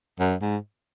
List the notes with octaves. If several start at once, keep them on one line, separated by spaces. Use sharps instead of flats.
F#2
G#2